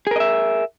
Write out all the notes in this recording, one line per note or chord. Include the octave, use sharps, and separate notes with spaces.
G#4 A#4 D#5 E5